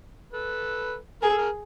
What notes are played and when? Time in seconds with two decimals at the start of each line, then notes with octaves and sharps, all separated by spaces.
0.33 A4 B4
1.22 G#4 A#4
1.30 A4
1.38 G#4 A#4